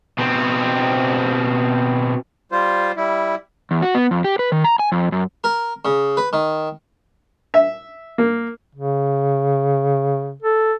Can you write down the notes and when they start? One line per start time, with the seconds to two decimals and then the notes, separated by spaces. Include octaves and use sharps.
0.19 B2 C4
2.52 G3 F4 C5
2.97 G3 E4
3.71 E2
3.82 F#4
3.95 B3
4.11 F2
4.24 G4
4.39 B4
4.52 D#3
4.64 A#5
4.79 G#5
4.92 F2
5.12 F#2
5.44 A#4
5.85 C#3
6.17 B4
6.33 D#3
7.54 E5
8.18 A#3
8.75 C#3
10.42 A4